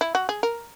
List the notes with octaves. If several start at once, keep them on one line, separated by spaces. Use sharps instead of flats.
E4
F#4
G#4
A#4